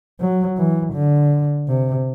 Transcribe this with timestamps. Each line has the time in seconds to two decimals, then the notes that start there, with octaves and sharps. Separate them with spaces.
0.20 F#3
0.57 E3
0.94 D3
1.68 C3